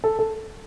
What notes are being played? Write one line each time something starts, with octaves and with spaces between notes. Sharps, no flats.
A4
A4